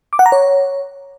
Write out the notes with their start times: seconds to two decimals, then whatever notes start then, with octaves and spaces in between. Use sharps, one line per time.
0.13 D6
0.19 F#5
0.26 A#5
0.32 C#5